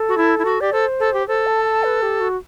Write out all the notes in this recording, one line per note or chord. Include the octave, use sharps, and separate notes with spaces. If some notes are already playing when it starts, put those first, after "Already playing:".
Already playing: A4
F#4
E4
E4
F#4
G4 D5
A4 C5
A4
G4
A4 C5
A5
A5
B4
G4
F#4